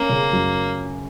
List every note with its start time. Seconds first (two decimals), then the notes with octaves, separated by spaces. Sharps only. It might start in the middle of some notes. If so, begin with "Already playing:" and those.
Already playing: A#3 C#4
0.09 C#3
0.33 F#2